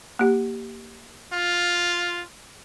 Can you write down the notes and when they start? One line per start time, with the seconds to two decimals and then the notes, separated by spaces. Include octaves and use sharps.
0.19 A#3 G4
1.33 F4